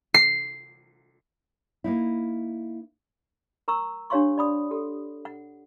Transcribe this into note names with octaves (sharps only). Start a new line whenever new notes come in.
C7
A#3 D#4 E4
A#4 A#5 C#6 E6
D4 G4 C#5 F5 C6 C#6
D5 B5 D#6
G4 A4
F#5